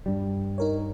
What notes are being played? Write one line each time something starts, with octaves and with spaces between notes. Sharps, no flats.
G2 G3
D#4 A#4 C#5